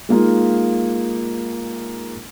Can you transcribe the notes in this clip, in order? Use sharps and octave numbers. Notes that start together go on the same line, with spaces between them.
G#3 A#3 D#4 F4